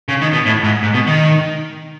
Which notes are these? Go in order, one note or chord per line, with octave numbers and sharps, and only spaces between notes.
C#3
D#3
B2
A2
G#2
G#2
B2
D#3